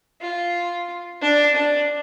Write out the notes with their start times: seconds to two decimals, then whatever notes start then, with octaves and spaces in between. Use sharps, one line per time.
0.21 F4
1.21 D4
1.55 D4